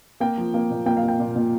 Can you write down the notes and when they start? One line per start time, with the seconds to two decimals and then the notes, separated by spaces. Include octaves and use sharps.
0.20 A#3 G5
0.38 F3
0.54 A#3
0.71 A#2
0.86 A#3 G5
0.97 F5
1.03 A#3
1.08 G5
1.20 A#2
1.36 A#2